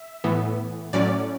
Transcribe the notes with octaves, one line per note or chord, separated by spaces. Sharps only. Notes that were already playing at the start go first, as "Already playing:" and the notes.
Already playing: E5
A2 E3 B3
A2 F#3 C#4 D5